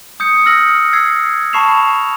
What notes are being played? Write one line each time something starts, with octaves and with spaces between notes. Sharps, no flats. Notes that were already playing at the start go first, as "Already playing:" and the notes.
D#6 G6 C#7
E6 F6 A#6 F#7
E6 G#6 C7
A5 B5 C#6 C7 E7 F7